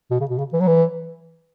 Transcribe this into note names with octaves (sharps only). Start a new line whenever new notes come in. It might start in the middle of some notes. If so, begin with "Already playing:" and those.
B2
C#3
B2
C#3
E3
F#3
E3